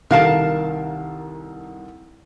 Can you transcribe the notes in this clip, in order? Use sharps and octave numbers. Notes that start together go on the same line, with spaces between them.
C2 D#3 A4 A#4 F5 A5